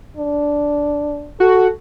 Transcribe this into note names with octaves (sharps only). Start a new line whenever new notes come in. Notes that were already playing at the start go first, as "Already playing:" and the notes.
D4
F#4 A4